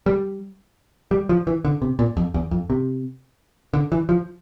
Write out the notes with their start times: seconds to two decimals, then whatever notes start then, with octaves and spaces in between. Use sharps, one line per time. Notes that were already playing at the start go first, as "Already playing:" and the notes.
0.06 G3
1.11 G3
1.29 F3
1.47 E3
1.65 D3
1.82 C3
1.99 A#2
2.17 F2
2.34 E2
2.51 F2
2.70 C3
3.74 D3
3.92 E3
4.09 F3